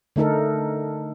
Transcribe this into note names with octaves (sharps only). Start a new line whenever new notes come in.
D3 A3 D#4 A4 A#4